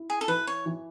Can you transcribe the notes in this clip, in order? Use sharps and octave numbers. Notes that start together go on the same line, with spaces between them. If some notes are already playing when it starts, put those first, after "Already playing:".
Already playing: E4
G#4
A4
E3 B4
C#5
E3